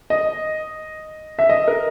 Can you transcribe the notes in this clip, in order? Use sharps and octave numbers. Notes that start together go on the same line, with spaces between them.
D#5
E5
D#5
A#4